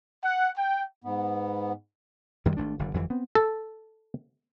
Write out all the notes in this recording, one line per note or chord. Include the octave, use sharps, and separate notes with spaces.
F#5
G5
G#2 B3
F#2 D#3 G3 G#3
G#1 A3 D4
F#1 D3
G1 F2 E3
B3 C4
A4